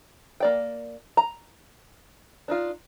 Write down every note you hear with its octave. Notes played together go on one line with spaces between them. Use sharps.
A#3 D5 G5
A#5
D4 D#4 F4